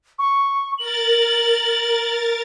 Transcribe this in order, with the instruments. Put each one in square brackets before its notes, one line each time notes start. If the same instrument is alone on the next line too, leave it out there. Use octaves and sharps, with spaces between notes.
[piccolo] C#6
[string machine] A#4 A6 [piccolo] F#7